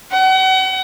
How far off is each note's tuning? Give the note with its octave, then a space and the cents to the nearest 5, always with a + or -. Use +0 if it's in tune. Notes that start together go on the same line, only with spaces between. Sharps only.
F#5 +35